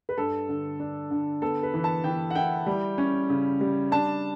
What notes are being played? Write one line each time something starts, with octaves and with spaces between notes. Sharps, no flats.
B4
G2 A4
D3
D4
D3
B3 A4
B4
E3
A5
E3 G5
F#5
E4 G5
G3
C#4
C#3
G3
D4 A5